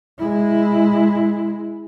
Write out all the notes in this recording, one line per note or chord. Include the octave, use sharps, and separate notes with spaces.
G#3 E4